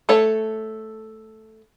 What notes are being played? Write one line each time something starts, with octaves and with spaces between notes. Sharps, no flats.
A3 A4 C#5